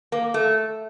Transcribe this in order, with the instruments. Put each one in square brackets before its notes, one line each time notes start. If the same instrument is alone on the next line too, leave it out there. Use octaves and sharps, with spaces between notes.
[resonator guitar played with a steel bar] A#3
A3